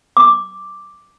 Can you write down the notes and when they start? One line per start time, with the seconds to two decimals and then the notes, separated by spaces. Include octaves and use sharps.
0.17 D6